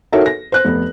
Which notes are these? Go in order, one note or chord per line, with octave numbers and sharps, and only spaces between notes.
D#4 F#4 A4 A#4 C#5 E5
A#6
C5 F#6
F1 B3